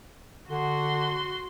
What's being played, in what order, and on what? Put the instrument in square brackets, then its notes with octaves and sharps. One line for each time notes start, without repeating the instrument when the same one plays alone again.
[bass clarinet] D3 [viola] F#4 C6